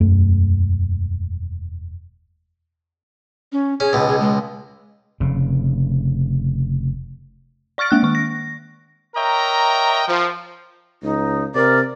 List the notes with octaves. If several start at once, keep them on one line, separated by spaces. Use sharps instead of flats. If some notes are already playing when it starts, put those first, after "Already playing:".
E1 F#2 A3
C#4
C#4 G#4
C#2 B2
G#4
G#3
F1 C#3
D5 C#6 F6 A6 D7
G#3 A#3 F#6
D#3 C#6
A#6
A#4 C#5 D#5 E5 G5 A#5
F3
C#2 D#4
C3 A#4 D5